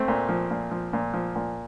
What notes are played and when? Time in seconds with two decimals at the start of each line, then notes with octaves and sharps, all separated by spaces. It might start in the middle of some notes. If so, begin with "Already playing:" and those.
Already playing: A3 C4
0.08 A#2
0.29 F3
0.51 A#2
0.71 F3
0.93 A#2
1.14 F3
1.35 A#2